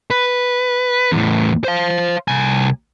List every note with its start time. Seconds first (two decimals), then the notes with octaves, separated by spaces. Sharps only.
0.10 B4
1.12 E2 A2
1.64 C5 F5
2.28 C2 G#5